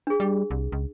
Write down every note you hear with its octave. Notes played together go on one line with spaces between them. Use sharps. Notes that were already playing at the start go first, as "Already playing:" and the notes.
D4 G#4
G3
C2
C#2